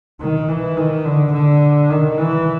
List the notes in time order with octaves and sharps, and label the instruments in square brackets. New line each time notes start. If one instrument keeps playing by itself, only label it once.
[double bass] D#3
E3
D#3
D3
D3
D#3
E3